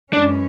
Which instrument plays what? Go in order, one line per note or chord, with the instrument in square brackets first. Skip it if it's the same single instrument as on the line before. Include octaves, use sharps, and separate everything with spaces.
[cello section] F#2 E3 G#3 C#4 [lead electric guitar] D4